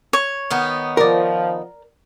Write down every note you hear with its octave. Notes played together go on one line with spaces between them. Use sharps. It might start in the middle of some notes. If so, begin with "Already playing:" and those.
C#5
D#3 B3 D#4
F3 A#4 D5